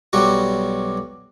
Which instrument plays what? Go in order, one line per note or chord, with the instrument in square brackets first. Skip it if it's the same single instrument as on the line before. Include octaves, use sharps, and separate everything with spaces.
[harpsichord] B1 F#3 G3 F#4